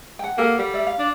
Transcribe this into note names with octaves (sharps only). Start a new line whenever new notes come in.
F#5 G5
A#3 G4 A4 F#5
G3
D5 E5
F5
D4